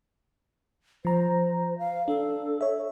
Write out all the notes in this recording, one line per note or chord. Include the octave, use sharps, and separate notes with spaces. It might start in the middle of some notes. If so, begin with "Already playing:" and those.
F3 C5 A#5
F5
D4 A4
C#5 E5